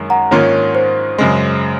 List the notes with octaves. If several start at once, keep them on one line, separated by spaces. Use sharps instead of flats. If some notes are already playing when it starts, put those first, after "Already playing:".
Already playing: F#2 D#3 G#3
F#5 A#5
G#2 D#3 A#3 C#4 F4 C#5
C5
F#2 C#3 G#3